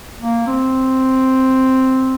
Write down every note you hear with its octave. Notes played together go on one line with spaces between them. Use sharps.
A#3
C4